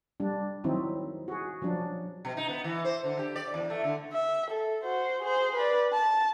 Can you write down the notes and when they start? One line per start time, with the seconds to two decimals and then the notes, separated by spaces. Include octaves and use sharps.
0.20 G3 D4
0.64 D#3 F#3 C4 D#4 E4
1.28 F#4 G#4
1.62 F3 F#3 D4
2.25 B2
2.37 D#4
2.49 B3
2.64 E3
2.85 C5
3.04 D3
3.19 G4
3.36 D5
3.54 E2
3.70 A3
3.84 D3
4.13 E5
4.50 A4
4.84 F#4 C5
5.23 G#4 C5
5.55 B4 D5
5.93 A5